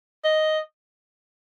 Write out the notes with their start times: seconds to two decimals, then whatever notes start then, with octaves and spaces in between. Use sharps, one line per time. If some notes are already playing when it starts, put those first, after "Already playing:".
0.24 D#5